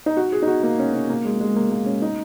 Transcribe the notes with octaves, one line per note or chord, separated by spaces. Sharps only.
D#4
F#4
G#4
D#4
F#4
A#3
C#4
C#4
A#3
G#3
G#3
A#3
A#3
C#4
D#4